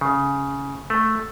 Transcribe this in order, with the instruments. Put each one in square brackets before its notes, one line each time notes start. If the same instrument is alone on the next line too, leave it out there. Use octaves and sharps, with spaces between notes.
[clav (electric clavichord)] C#3
A3